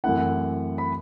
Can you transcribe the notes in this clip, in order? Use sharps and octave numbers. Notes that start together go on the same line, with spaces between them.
F#2 E3 A3 C4 E4 F#5
B5